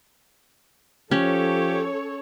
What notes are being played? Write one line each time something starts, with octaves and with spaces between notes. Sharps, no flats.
F3 C#4 G4 A4 C#5